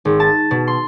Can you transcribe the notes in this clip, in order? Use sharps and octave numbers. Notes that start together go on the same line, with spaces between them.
G#1
A5
B2
C6